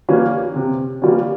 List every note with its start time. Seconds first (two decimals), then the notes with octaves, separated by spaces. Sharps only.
0.09 E3 G3 A#3 C#4
0.56 C3
1.02 E3 G3 A#3 C#4